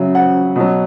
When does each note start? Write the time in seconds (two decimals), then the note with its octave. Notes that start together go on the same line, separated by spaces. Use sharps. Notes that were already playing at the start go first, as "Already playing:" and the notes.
Already playing: C#3 F#3 E5
0.15 F#5
0.56 B2 F#3